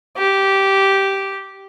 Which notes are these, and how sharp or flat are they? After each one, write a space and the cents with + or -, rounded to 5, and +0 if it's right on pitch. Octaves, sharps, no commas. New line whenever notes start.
G4 -10